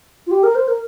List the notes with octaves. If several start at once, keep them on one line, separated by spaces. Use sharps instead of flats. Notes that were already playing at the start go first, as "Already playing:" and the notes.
F4
G4
A#4
C5
A#4